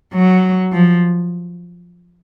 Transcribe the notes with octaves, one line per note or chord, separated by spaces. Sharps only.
F#3
F3